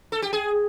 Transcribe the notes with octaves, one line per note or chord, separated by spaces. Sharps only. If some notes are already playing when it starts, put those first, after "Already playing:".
A4
G4
G#4